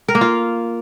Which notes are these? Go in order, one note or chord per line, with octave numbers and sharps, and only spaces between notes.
A#4
A#3
F4